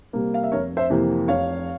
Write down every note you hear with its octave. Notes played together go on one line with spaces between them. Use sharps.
C3 G3 A#3
F5
E5
F1 A#4 C#5
C5 E5
F2 C3 E3 A#3
F1 C#5 F5